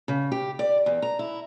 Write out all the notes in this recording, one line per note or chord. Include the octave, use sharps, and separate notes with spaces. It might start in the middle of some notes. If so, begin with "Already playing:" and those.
C#3
G4
D5
E2
A#5
E4